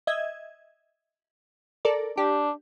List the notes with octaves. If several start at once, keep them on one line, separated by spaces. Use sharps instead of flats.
D#5 E5 G#6
A4 A#4 D5
D4 G4